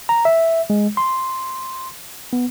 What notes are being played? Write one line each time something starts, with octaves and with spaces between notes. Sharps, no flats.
A#5
E5
G#3
C6
B3